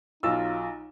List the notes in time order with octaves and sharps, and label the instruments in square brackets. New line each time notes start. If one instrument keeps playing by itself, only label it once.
[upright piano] B1 F4 E6 [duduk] D#4